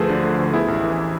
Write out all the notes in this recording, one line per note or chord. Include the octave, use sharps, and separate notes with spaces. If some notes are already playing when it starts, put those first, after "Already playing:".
Already playing: D2 F3 A3 G#4 A4 B4 C5
D3
A3
D2
B3 E4 G#4
A1
E3